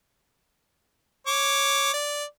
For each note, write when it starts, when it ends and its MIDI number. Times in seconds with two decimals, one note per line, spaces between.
1.27 1.91 73
1.27 1.91 86
1.94 2.24 74